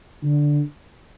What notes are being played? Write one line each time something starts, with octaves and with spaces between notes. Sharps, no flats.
D3